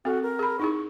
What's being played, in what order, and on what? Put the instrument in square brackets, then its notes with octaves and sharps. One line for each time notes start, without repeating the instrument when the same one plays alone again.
[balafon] C4 A4 [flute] F#4
[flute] A#4
[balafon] G#4 B5
[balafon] D#4 E4 G#4 [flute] C#6